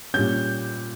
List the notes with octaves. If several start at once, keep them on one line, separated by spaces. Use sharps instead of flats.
A#2 G3 C#4 G6